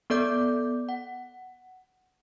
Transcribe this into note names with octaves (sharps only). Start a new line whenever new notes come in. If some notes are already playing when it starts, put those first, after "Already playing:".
B3 A4 D5 D6 G6
F#5